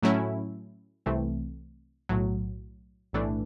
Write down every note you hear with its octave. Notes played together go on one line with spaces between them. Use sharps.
A2 F#3 A3 C#4 E4
C2 C3 E3 A3 C4
B1 A2 F#3
B1 A2 E3 A3 D4